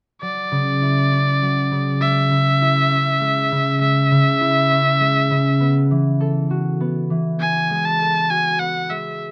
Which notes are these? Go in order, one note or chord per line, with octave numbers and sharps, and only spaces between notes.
F#3 D5
C#3
E4
C#4
F#3
C#3
G#3 E5
C#3
E4
C#4
G#3
C#3
G#3 E5
C#3
E4
C#4
G#3
C#3
B3
E3
A4
F#4
B3
E3
B3 G#5
G#3
A5
A4
F#4 G#5
B3 F#5
G#3 E5